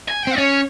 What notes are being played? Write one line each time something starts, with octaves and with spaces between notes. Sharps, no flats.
G#5
C4 G5
C#4 C#5